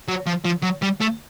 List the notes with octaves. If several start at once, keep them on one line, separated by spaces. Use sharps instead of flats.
F#3
F3
F3
F#3
G3
A3